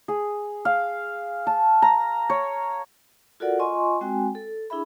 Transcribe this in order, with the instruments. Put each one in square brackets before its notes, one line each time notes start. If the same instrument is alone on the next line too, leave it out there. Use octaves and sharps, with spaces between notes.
[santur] G#4
F5
A5
A#5
C#5
[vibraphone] F4 F#4 A4 A#4 D5 F#5
F4 D#5 G#5 C6 C#6
G#3 C4 F#4 G5 G#5
A4
D4 E4 G#4 E5 B5